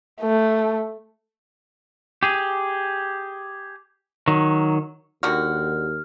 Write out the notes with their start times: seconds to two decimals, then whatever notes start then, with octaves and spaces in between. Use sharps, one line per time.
0.21 A3
2.23 G4 G#4
4.28 D#3 F#3
5.23 D#2 D3 D#3 F#4 F6